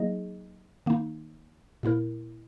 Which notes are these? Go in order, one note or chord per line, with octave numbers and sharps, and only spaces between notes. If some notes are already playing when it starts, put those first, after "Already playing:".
Already playing: F#3 A#3 D#4 G#4 D#5
D#3 A#3 D#4
A#2 A#3 E4 A#4